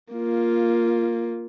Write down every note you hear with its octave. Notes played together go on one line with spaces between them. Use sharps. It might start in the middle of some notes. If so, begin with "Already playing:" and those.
A#3 F4